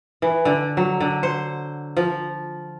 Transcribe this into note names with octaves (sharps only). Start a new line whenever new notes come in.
E3
D3
F#3
D3
C5
F3